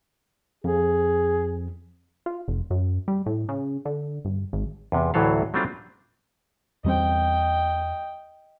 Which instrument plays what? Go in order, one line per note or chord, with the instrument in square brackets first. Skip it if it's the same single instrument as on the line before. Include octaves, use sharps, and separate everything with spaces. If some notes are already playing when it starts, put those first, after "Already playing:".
[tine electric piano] F2 [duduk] G#4
[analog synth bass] F4
F1
F#2
G3
A2
C#3
D3
G1
G#1
[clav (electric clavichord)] E2 C3
D2 A2 E3 F#3 A4 F5
F#3 G3 A3 C4 D4 F4
[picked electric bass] E2 G3 C4 [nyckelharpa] D#5 G5